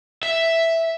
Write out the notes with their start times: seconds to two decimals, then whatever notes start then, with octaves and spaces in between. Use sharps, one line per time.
0.23 E5